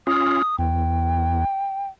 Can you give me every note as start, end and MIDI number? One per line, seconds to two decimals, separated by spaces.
0.07 0.42 61
0.07 0.42 65
0.07 0.56 87
0.59 1.44 40
0.59 1.88 79